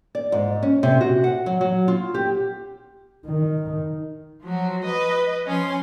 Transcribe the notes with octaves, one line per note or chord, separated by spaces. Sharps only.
D5
G#2
C#4
C3
F#4
F#5
F#3
F#3
F4
G4
D#3
F3 F#3 F#4
B4 D#5
F3 C#4 C6